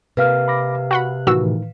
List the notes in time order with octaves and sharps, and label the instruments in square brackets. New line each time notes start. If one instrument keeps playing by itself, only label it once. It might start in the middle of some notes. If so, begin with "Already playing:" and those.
[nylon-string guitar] C3 A#3 [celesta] B4 F5 F6
[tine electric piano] B5 D6 A#6
[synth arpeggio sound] F#4 F#5 B5 [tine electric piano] F#6
[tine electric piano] A2 D#3 E3 [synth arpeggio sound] F#4 E6